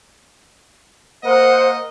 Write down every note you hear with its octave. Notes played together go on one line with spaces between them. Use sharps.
A#3 A#4 C5 D#5 F#5